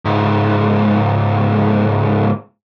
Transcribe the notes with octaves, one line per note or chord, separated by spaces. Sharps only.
C#2 G#2